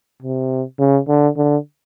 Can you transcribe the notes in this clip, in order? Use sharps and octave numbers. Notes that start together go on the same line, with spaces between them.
C3
C#3
D3
D3